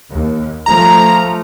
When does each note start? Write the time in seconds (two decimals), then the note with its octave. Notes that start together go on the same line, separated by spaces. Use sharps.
0.10 D#2
0.66 F3 A3 A#5